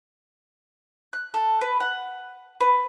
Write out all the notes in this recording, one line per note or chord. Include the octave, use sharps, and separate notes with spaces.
F#6
A4
B4
F#5
B4